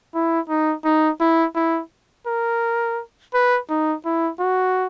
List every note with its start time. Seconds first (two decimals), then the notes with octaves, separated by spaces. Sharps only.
0.15 E4
0.49 D#4
0.85 D#4
1.21 E4
1.55 E4
2.27 A#4
3.34 B4
3.70 D#4
4.05 E4
4.40 F#4